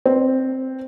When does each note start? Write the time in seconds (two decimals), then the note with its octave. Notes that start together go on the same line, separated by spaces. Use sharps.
0.06 C4